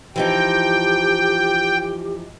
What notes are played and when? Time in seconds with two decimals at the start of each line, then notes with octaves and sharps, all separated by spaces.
0.16 E3 F3 D#4 G4 G5